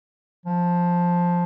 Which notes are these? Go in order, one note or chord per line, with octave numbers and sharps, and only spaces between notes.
F3